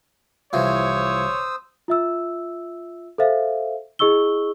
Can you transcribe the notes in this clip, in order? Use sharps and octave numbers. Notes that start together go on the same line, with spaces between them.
C2 E3 F3 C5 C#5 D#6 E6
F4 E5 E6
A4 C5 E5 F5
E4 G#4 D#5 C#6 E6 G7